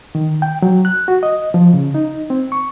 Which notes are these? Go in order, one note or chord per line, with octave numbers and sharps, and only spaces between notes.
D#3
G5
F#3
F#6
F#4
D#5
F3
C#3
D#4
C4
C#6